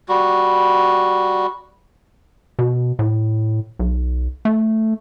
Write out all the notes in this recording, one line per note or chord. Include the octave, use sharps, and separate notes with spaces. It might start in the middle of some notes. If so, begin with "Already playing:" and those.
G3 F#4
B2
A2
B1
A3